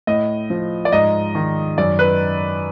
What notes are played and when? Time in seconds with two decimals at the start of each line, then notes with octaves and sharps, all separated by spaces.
0.07 A2 D#5
0.50 F3
0.85 D5
0.92 G#2 D#5
1.35 D#3
1.78 F#2 D5
1.99 B4